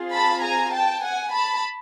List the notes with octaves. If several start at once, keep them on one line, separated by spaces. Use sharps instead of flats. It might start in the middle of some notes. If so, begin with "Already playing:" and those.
Already playing: C4 F4 G#4
A5 B5
G#5 A#5
G5 A5
F#5 G#5
A5 B5